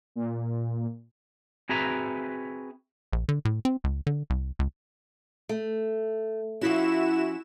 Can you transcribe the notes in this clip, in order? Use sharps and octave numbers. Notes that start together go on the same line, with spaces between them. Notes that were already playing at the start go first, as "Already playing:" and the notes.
A#2
C4 F#4 G#4 B4 E5 A#5
A#1
D3
A2
C4
C#2
D3
C2
C#2
A3
F3 C#4 E4 F#4 E7